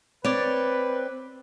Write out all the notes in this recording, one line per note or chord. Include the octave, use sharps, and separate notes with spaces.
C4 B4 C#5 D5